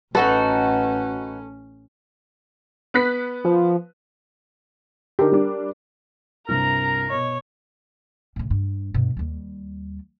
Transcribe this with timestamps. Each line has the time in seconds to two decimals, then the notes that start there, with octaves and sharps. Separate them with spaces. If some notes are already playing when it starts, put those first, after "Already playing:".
0.15 A1 C#4 D#4 F#4 A4 B4
2.94 B3 F#6 B6
3.45 F3
5.19 D3 D#4 G4 A#4
5.32 G3 D4
6.48 C2 G2 C3 A#4 A#5
7.10 B2 C#5 D#5
8.36 A2 C#3
8.50 G2
8.94 G2 B2
9.17 D#2 G3